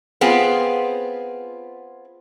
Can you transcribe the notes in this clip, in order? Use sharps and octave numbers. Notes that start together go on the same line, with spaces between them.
B3 C4 F4 G#4